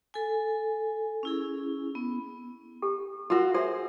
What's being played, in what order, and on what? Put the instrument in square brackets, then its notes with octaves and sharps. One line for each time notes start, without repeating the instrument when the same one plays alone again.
[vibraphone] A4 G#5
C#4 E4 G#4
B3
[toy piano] G4 A4
[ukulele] F4 F#4 [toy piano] A4 A#4
[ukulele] G#4 C5 [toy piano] A4 C#5 E5